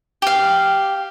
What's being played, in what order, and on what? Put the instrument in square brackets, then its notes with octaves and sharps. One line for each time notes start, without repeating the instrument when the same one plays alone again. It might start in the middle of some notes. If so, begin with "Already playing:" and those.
[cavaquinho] G4 F5